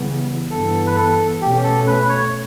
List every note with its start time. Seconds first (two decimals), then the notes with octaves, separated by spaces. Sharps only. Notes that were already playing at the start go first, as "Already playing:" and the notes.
Already playing: C#3 E3 G3 B3
0.50 G2 E3 B3 A4
0.87 B4
0.95 A4
1.42 B2 A3 C#4 G4
1.64 A4
1.87 B4
2.09 C#5